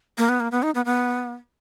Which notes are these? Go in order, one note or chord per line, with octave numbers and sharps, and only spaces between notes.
A#3
B3
A#3
B3
D#4
B3
B3